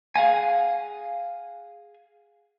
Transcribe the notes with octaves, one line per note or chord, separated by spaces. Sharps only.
G#4 F5 F#5 G#5